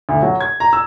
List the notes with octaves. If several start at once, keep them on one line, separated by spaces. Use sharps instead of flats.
D2
F#3
G#6
A#5
E6